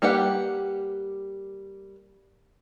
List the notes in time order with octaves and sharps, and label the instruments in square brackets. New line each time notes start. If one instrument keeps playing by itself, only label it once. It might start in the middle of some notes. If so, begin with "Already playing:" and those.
[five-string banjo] G3 A#3 G4 B4 F#5